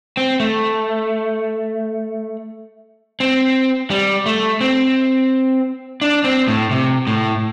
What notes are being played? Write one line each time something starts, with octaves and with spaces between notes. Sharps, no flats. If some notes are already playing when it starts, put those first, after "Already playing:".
C4
A3
C4
G3
A3
C4
D4
C4
A2
C3
A2